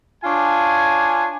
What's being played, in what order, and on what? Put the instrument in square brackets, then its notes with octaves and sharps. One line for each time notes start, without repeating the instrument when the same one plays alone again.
[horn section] D4 F4 C#5 G#5